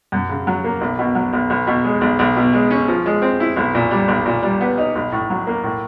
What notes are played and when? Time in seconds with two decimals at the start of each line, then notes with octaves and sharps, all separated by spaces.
0.12 F#2
0.29 C#3
0.47 F#3
0.64 A#3
0.81 B1
0.99 B2
1.15 F#3
1.33 B1
1.50 B1
1.67 B2
1.84 G#3
2.01 B1
2.19 B1
2.36 B2
2.53 G#3
2.71 C#4
2.88 F3
3.06 G#3
3.22 C4
3.40 E4
3.56 B1
3.75 A#2
3.91 G3
4.08 B1
4.26 A#2
4.43 G3
4.61 B3
4.78 D#4
4.95 B1
5.12 A2
5.30 F#3
5.47 A#3
5.64 A2